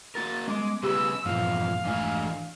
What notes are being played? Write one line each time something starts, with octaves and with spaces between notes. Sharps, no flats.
A#3 F#4 A#4 A6
G3 G#3 B3 C#4 D6
C#3 G4 G#4 B4 E6
E2 G2 A#2 F3 F5
F1 G#2 E3 A3 D4 G#5